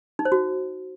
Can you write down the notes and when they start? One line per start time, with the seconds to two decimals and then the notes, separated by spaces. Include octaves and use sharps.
0.19 D#4
0.25 C5
0.32 F#4